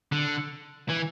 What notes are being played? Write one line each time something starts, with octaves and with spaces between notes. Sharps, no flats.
D3
E3